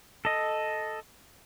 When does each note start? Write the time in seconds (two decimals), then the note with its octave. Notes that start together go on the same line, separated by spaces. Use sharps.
0.25 A4 D#5